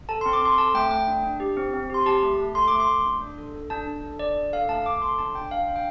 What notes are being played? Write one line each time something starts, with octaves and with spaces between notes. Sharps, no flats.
A4 A5
C6
C4
D6
C4 C6
A4 A5
A3 G5
A3 G5
D4
D4
G4
C4
C4
G4 C6
G4 A5
A3
A3
A4 C6
A3 D6
C6
A3
D4
D4
A4
A4
D4 A5
D4
A4
D4 D5
D4
A4 F5
A3 A5
A3 D6
A4 C6
D4 A5
D4 G5
D4 F5
D4
G5